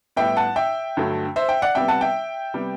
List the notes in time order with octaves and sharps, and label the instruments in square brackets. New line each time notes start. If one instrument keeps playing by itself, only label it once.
[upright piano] A2 G3 B3 E5 G5
F#5 A5
E5 G5
G2 D3 F#3 A3
C5 E5
E5 G5
D5 F#5
C3 G3 B3 E5 G5
F#5 A5
E5 G5
C3 G3 B3